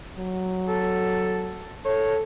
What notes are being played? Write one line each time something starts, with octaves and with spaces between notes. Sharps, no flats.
F#3
A4
A4 C#5